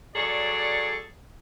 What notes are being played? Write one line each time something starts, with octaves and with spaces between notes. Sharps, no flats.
F#3 G#4 A4 C#5 D5